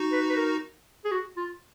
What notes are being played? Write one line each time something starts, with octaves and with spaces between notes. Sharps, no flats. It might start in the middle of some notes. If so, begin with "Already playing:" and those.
Already playing: D#4 F#4
B4
B4
A#4
G#4
F#4
F4